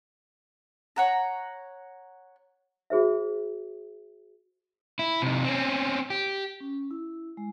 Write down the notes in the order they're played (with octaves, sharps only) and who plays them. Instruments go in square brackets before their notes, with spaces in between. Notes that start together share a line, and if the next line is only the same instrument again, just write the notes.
[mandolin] C#5 F#5 A#5
[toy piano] F#4 G#4 C5 E5
[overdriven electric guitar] E4
C3 D#4
C4 C#4
G4
[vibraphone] C#4
E4
G#3